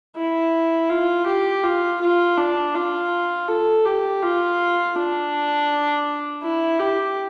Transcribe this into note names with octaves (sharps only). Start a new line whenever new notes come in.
E4
F4
G4
F4
F4
D4
F4
A4
G4
F4
D4
E4
G4